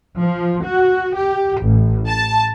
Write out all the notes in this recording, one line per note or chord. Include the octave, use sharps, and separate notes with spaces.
F3
F#4
G4
A1
A5